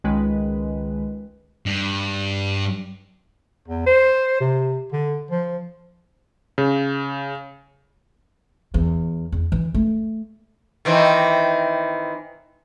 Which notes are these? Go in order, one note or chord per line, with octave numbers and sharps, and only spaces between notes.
C#2 D#3 G#3 B4
G2
E2
C5
C3
D3
F3
C#3
E2
E2
E3
A3
D#3 E3 C4